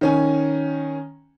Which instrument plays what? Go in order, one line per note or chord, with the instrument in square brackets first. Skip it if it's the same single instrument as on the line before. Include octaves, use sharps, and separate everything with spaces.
[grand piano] D#3 C#4 G#5